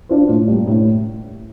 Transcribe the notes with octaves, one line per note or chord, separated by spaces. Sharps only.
D4 F4 C5
A2
G3 A#3
A2